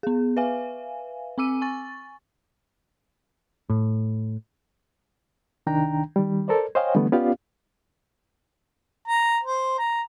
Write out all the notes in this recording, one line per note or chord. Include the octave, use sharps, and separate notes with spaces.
B3 G#4
B4 E5 F5 G#5
C4 G#5 D6 E6 D#7
G#5 C#6 A6
A2
C2 D#3 D4 G5 A#5
D#3 G3
A4 A#4 C5 D5
C5 C#5 D#5 F5 G5 G#5
D3 E3 G3 A3 B3
B3 C#4 F4 G4 D5 F5
A#5
C5
A#5